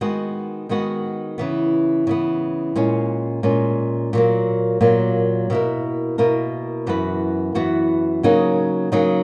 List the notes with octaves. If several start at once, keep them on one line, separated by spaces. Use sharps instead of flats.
D#3 G#3 B3 F#4
D#3 G#3 B3 F#4
C#3 E3 B3
C#3 E3 B3
A#2 G#3 C#4
A#2 G#3 C#4
A#2 F#3 A#3
A#2 F#3 A#3
B2 A#3 E4 A#4
B2 A#3 E4 A#4
F#2 E3 B3 F#4 B4
F#2 E3 B3 F#4 B4
C#3 F#3 A#3 D#4 G#4
C#3 F#3 A#3 D#4 G#4